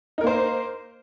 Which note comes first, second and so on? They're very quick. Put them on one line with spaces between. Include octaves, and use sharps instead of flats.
D#4 A#4 A#3 C5